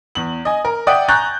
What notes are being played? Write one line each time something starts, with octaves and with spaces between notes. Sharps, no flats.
E2 F#7
D#5 G#5
A#4
D5 E5 F#5 G5 D#6
G#5 A#5 C#6 F#6 G6 A6